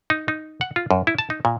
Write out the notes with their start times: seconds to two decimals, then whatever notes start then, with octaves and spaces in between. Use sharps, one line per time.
0.10 D#4
0.28 D#4
0.61 F#5
0.76 F4
0.91 F#2
1.07 E4
1.19 A5
1.30 D#4
1.45 A#2